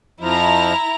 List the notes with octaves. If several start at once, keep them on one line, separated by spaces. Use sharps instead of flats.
F2 F3 E4 A#5